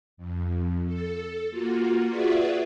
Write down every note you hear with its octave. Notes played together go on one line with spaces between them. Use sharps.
F2
A4
A#3 F4 F#4
F4 F#4 G#4 B4 D5 E5